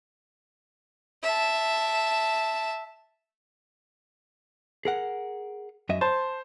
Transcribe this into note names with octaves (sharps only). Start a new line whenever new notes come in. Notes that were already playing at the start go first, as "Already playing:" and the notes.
E5 A5
G#4 A#4 F#5
F#2 D#5 E5
C5 A5